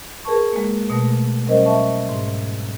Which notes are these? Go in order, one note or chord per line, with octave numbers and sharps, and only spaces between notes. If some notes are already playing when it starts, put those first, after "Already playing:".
G#4 A#4 B4 A5 C#6
G#3 A#3
B2 A3 A#6
F#3 G3 C#4 A#4 C5 D#5
E5 A5 C#6
G#2